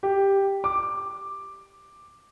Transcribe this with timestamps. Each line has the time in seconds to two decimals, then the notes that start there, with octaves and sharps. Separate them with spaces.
0.03 G4
0.64 D6